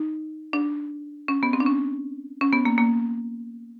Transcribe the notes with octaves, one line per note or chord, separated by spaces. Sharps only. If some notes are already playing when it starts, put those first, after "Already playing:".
Already playing: D#4
D4
C#4
B3
C4
D4
C#4
C#4
B3
A#3
A#3